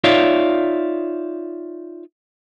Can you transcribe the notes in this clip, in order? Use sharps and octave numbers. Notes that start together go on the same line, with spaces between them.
D#4 F4 C#5 D5 E5 F5